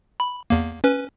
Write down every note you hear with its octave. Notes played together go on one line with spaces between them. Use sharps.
B5
E2 A#3
C#4 B4